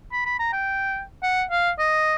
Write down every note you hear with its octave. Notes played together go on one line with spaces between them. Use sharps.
B5
B5
A#5
G5
F#5
F5
D#5